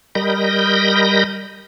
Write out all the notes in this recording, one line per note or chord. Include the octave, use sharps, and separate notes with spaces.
G3 A#4 D#5 B5 G6 A#6